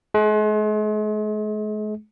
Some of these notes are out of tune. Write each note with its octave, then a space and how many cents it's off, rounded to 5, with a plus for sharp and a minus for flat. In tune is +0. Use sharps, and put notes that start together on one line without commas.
G#3 +40 G#4 +0